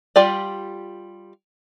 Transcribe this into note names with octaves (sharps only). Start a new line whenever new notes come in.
G3 F4 G4 D5